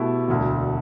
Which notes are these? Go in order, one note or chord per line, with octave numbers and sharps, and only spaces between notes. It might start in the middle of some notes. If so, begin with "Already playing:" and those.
Already playing: B2 A3 E4 G4
E1 D2 D3